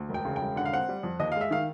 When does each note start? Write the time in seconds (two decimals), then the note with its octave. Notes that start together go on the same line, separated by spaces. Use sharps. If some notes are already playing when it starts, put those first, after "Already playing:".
Already playing: D2
0.09 E1
0.14 G5
0.25 C#3
0.36 G5
0.42 E1
0.56 D3 F#5
0.65 F5
0.73 C4 F#5
0.89 G3
1.03 F2
1.19 D#2 D#5
1.32 F5
1.36 G#3 E5
1.51 D#3 F5